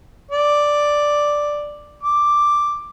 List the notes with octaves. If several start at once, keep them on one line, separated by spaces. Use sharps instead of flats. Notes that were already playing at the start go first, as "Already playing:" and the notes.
D5
D6